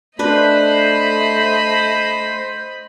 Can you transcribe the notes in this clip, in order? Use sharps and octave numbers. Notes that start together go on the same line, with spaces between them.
A3 D4 B4 C5 D#5 B5